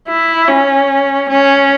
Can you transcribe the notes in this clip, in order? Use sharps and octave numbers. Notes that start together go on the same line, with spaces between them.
E4
C#4
C#4